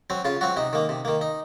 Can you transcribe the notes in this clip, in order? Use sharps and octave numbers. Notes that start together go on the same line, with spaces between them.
F#3 C4
C#3 F4
F#3 C4 F#4
C3 D#4
D#3 A#3
C3
D#3 A#3
D#4